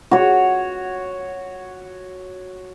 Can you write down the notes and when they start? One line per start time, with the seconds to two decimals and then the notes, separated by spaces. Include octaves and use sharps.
0.11 F#4 C#5